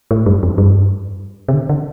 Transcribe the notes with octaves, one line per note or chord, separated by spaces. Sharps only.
A2
G2
F2
G2
C3
D3
D3